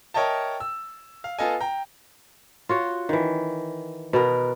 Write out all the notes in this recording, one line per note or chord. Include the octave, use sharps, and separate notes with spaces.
A#4 C#5 D#5 E5 G5 A5
E6
F5
B3 F4 A4 D#5 G#5
G5 A#5
F4 F#4 C#5
D#3 E3
B2 B3 A#4